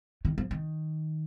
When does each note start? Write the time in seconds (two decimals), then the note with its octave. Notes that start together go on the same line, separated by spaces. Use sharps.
0.25 D#3
0.38 F3
0.51 D#3